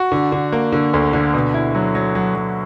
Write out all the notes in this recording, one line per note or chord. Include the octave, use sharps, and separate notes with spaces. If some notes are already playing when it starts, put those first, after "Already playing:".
Already playing: F#4
D3
D3
A#3
D3
D2
D3
B2
E4
F#3
F#3
F#3
F#3